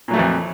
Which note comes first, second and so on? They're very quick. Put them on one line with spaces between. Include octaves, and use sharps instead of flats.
A#2 F#3 A3 E3 F2